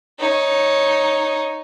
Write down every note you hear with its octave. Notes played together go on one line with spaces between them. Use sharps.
D#4 C#5